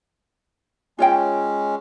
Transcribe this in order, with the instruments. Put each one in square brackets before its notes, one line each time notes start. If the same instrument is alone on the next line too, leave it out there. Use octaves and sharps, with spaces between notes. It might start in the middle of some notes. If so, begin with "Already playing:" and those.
[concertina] G#3 C#4 [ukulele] F4 C#5 G5